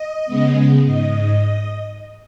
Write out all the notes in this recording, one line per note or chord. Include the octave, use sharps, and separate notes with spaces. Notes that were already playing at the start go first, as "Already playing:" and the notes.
Already playing: D#5
C#3 G#3 B3
G#2 D#5